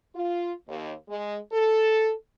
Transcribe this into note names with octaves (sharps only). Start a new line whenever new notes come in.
F4
D#2
G#3
A4